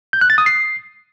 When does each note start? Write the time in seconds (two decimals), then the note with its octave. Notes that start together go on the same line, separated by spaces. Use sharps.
0.13 G6
0.21 F#6
0.30 A6
0.38 D#6
0.46 C7